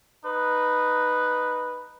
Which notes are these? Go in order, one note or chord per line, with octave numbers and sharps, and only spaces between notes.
D#4 B4